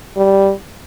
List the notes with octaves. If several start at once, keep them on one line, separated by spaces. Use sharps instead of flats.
G3